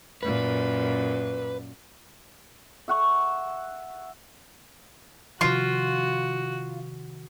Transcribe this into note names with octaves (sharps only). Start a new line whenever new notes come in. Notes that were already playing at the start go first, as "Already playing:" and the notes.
F#2 A#2 B4
E5 F#5 C#6
C3 D#3 F3 F4 F#4